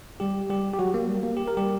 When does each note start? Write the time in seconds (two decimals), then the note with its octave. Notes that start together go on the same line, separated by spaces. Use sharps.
0.20 G3 G4
0.49 G3 G4
0.74 G4
0.79 F#3 F#4
0.94 A#3
1.08 G3
1.23 A#3
1.37 G4
1.48 A#4
1.57 G3 G4